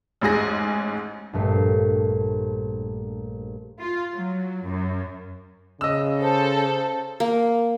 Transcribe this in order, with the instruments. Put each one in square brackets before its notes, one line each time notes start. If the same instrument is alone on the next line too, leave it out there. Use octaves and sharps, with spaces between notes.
[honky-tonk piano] A1 G#2 G#4 A#6
[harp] A#1 G2 A3 G4 C7
[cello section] F4
F#3
F#2
[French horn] C#3 [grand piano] D#5 E6
[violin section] A4 [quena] C5
[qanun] A#3